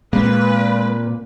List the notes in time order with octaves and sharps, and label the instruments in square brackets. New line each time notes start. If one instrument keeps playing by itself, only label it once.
[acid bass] A#2 [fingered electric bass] G#3 [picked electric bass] A#3 C4 [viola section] B4